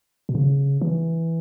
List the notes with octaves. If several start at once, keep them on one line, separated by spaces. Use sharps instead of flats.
B2
C#3
E3